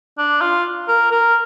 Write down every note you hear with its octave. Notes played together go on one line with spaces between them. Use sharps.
D4
F4
A#4
A#4